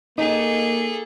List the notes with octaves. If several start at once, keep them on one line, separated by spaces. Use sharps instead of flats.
A#3 D#4 G#4 A4